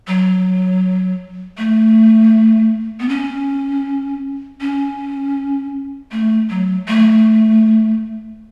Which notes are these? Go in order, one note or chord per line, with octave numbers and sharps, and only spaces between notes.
F#3
A3
B3
C#4
C#4
A3
F#3
A3